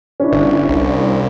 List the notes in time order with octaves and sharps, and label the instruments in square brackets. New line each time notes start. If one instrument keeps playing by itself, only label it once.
[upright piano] C#4 D4 E4
[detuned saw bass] G1
C2